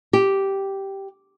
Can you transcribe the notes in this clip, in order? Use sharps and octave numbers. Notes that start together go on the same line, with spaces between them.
G4